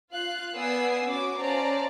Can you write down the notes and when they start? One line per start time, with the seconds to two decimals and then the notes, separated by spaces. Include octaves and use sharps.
0.12 F4 F5 F#6
0.54 B3 D5 G#5 D#6 E6 C7
1.07 C#4 F#4 D6
1.39 C#4 C5 D5 F5 A5 A#5